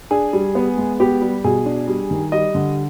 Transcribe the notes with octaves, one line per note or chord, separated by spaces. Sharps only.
D4 G#4
G3
B3
G#3
B3 G4
G3
B2 G#4
D4
G3
D#3
G3 D#5
D3